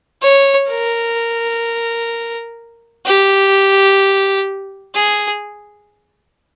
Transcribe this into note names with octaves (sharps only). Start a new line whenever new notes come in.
C#5
A#4
G4
G#4